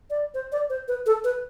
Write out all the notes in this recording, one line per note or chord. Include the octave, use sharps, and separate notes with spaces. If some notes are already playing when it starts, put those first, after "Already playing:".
D5
C5
D5
C5
B4
A4
B4